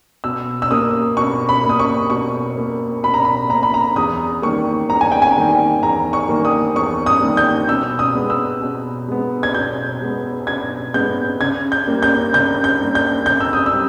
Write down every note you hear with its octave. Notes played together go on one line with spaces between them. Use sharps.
B2 E6
E6
A#3 D#6
B2 C#6
B5
A#3
D#6
C#6
B2 C#6
A#3
B2 B5
A#5
B5
A#3 A#5
B5
A#5
E2 D#6
D#3 G3 A#3 C#6
E2 A#5
G#5
G5
G#5
D#3 G3 A#3
E2 A#5
C#6
D#3 G3 A#3
D#6
E2 C#6
D#6
D#3 G3 A#3
G6
B2 E6
D#6
G#3 B3
E6
B2
G#3 B3
G#6
B2 G6
G#3 B3
B2 G#6
G#3 B3 G6
C#3 G#6
G6
G3 A#3
G6
C#3 G6
G6
G3 A#3
G6
C#3 G6
E6
D#6
E6
G3